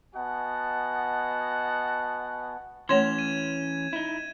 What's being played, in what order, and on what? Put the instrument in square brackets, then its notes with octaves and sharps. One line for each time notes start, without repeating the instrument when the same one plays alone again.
[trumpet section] B3 F#4 D#5 F#5 G#5 A5
[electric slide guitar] E3 C#4 [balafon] A3 C#5 C6 [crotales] G#6 E7
[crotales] D#7
[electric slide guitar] D#4 E4